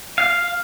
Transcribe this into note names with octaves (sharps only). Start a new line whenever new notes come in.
F5